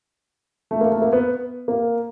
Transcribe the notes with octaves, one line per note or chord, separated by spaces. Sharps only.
A3
A#3
A3
A#3
B3
A#3